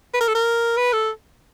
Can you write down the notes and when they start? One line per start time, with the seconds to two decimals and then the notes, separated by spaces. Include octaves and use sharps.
0.14 B4
0.20 A#4
0.28 A4
0.35 A#4
0.77 B4
0.93 A4